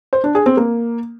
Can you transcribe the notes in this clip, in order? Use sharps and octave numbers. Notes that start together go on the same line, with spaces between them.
C5
D4
G#4
C4
A#3